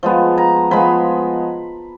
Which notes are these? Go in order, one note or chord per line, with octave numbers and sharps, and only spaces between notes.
F3 G#3 B3
A#5
F3 G#3 B3 B5